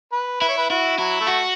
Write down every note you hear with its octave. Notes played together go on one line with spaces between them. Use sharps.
B4
E4 B4
C#5
B4
E4 F#4
F#3 E4
A3
F#4